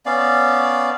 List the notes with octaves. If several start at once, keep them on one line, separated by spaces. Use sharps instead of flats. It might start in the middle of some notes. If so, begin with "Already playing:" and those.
B3 C#4 D5 F5